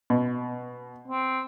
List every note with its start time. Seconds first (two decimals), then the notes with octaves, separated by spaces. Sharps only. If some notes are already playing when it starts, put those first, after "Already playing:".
0.10 B2
1.08 C4